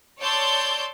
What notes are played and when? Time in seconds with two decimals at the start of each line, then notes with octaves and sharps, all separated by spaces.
0.21 C#5 D5 A5 C6 E6 G6